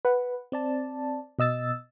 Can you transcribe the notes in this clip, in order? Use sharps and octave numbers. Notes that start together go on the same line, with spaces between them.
B4 F#5
C4 D5 A5
B2 D#5 E6 A6